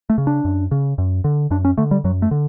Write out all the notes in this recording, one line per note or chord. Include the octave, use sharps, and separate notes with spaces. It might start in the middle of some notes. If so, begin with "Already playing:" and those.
A3
C#3
D4
F#2
C#3
F#2
D3
F#2 D4
C#4
D3 A3
G3
F#2 F#3
A3
D3